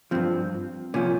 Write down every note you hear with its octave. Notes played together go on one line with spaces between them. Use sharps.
G2 F3 C4
C2 A#2 F3 C#4